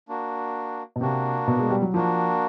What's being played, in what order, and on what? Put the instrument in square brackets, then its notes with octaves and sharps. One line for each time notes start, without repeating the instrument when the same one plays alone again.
[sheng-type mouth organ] A#3 D4 F#4
[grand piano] B2
[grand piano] C3 [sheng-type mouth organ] A#3 D4 F#4
[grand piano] B2
G#3
G3
F#3
[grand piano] F3 [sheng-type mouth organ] A#3 D4 F#4